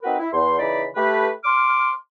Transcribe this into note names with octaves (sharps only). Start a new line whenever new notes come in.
C4 D#4 F#4 A#4 B4
E4
E2 C6
C#3 E3 D#4 D5 B5
A3 G4 B4
C6 D6 F6